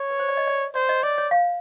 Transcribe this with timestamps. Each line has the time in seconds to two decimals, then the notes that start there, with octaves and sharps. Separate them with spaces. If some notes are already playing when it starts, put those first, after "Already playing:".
Already playing: C#5
0.10 B4
0.19 C5
0.29 D5
0.37 D#5
0.48 D5
0.75 C5 D5
0.89 D#5
1.03 C#5 D5
1.18 C#5
1.31 F5